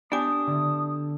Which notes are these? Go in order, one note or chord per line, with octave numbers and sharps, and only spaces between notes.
B3 D4 G4 G#5 D#6
D3